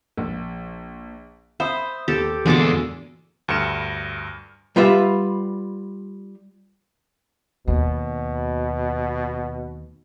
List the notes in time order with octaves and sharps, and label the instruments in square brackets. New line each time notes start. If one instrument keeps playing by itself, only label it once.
[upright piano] A#1
[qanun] C5 [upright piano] E5 B5 D#6
[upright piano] D#2 [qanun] G4 A4
[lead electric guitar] E2 [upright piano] A#2 D3 F#4 [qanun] G#3 A4 D6
[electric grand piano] D2 G2 F6 C#7 E7
[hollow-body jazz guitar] G3 F4 B4 E5
[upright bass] D#2 [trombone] B2